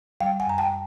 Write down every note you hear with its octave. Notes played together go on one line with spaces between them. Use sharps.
G3 F5 G5
F#5 G#5
F#2 A#5
G5 A5